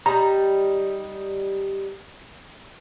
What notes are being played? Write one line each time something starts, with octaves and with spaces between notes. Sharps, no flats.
G3 D#4 A#5